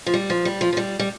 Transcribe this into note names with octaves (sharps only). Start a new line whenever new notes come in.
F3
G3
F3
G3
F3
F3
G3
G3